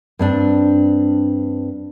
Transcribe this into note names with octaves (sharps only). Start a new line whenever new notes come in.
G2 C4 D4